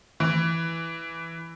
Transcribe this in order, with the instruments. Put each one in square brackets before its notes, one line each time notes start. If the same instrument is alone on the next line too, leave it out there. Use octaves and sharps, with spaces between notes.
[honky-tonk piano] E3